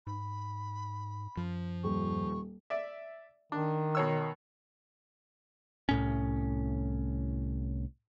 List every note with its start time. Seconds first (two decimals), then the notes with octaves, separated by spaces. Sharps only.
0.07 G#2 B5
1.37 F#2 F3
1.84 D#1 C#6
2.70 D5 E5
3.52 D#3 D4
3.95 B2 C#5 E6
5.89 C2 A2 C#4